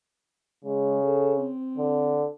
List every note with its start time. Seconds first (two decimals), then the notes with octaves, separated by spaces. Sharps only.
0.64 C#3 G#3
1.03 A4
1.36 C4
1.77 D3